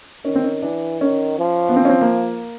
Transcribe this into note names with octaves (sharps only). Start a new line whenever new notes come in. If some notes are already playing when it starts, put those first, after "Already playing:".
D#3 C#4
C4
C#4
E3 D4
D#3 C#4
F3
B3
C4
C#4
C4
A#3